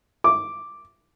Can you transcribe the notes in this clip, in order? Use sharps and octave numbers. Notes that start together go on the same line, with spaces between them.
D6